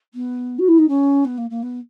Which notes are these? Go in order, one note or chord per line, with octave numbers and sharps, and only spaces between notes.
B3
F#4
E4
D#4
C#4
B3
A#3
A#3
B3